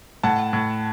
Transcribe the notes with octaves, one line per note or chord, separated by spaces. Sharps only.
A2 F#5 A5
A2